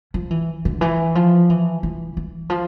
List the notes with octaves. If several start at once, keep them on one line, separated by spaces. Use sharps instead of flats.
F3
E3
D3
E3
F3
E3
E3
E3
F3